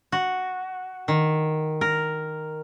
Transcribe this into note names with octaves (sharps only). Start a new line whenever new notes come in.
F#4
D#3
A#4